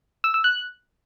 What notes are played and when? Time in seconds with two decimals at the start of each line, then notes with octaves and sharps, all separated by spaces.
0.24 E6
0.34 E6
0.44 F#6